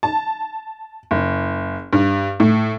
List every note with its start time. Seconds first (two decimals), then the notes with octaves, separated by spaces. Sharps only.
0.03 A5
1.11 F#1
1.93 G2
2.40 A2